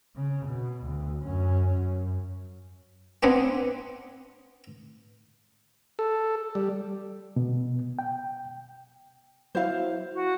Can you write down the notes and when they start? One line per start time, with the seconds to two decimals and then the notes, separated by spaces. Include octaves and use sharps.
0.16 C#3
0.46 B2
0.83 D2
1.23 F#2 C#4
1.77 F#2
3.23 B3 C4 D4 D#5 F#5 G#5
5.99 A4
6.55 G3
7.36 B2
7.99 G5
9.55 F#3 E4 C5 F5
10.14 F#4